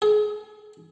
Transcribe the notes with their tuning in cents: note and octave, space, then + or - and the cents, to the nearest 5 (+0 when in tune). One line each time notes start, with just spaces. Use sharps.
G#4 +30